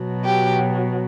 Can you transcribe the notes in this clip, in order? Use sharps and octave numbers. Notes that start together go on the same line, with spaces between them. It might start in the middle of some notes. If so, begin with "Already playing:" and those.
Already playing: B2 F#3
G4